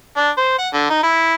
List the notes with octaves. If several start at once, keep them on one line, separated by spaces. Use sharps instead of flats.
D4
C5
F#5
D3
D#4
E4